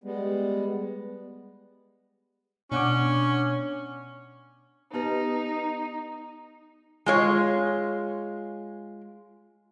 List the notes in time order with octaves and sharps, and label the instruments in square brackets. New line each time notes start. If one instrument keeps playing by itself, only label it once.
[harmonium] G3 G#3 B3
[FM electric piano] B2 F#5 D6 [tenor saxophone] C#4 [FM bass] D4
[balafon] B3 G4 B4 [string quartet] D#4
[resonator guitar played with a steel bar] G#3 F4 C#5